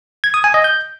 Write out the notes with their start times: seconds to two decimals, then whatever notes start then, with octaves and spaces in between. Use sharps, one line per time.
0.24 G#6
0.34 D#6
0.44 G#5
0.54 D#5
0.64 G6